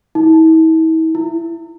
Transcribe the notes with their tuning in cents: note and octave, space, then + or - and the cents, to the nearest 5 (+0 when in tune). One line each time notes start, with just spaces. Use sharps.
E4 -45
E4 +20